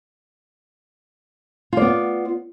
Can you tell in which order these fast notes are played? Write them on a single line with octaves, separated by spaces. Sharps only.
F4 D5 B3